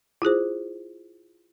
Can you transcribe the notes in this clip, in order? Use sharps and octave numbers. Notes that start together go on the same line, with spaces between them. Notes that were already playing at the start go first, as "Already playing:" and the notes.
E4 F4 G#4 C5